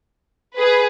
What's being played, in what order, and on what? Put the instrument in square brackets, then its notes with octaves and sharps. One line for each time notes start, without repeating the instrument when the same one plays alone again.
[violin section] G#4 B4